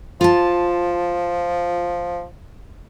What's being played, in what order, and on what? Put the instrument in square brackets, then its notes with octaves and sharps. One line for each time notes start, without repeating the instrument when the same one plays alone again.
[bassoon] F3 [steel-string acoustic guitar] F4 A5